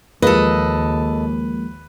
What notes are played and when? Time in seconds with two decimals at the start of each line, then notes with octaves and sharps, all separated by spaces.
0.22 D#2 F3 G#3 A#3 A4 B4 D#5